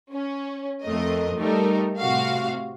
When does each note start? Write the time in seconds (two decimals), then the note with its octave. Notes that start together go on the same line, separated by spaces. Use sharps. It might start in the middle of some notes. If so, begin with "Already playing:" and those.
0.13 C#4
0.84 F2 A3 A#4 D#5
1.37 G3 A3 D#4 G4 A4 A#4
1.99 A2 C3 F#4 F5